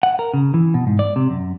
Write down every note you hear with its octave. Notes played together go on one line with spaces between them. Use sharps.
F#5
A#4
C#3
E3
B2
G#2
D5
C3
F#2